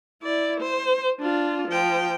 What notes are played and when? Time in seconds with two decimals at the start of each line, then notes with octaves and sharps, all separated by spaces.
0.23 E4 D5
0.61 C5
1.21 D4 F4
1.68 F3 G5